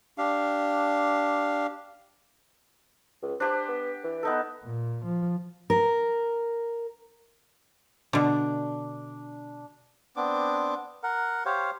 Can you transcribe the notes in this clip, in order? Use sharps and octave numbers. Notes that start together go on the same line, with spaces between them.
D4 G4 F5
C#2
D4 G4 C5
B3
E3
B3 D#4 A4
A#2
F3
A#4
B2 D3 D4 D6
B3 C4 D4 D6
A#4 F#5
G4 C5 C#5 F5